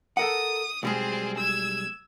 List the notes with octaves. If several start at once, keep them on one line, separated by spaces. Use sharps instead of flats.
A4 A#4 F#5 D#6
B1 G3 G#3 C4 G#4
E6 G#6